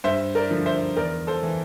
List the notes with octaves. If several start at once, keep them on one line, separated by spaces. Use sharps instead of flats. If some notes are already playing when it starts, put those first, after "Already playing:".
G2 C5 E5
A#4 D5
D3 F3
C5 E5
E2 A#4 D5
A4 C5
E3